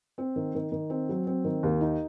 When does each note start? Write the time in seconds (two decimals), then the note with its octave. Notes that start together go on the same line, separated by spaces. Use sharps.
0.18 C4
0.36 D#3
0.55 D#3
0.72 D#3
0.90 C4
1.09 F#3
1.27 C4
1.44 D#3
1.63 D#2
1.81 D#4